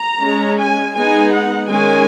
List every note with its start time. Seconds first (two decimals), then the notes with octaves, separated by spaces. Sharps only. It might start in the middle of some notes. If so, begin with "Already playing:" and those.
Already playing: A#5
0.21 G#3 C#4
0.58 G#5
0.94 G#3 B3 D#4 G#5
1.31 F#5
1.68 D#3 G#3 C#4 G#5